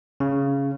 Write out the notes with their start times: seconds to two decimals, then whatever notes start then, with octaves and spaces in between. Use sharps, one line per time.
0.20 C#3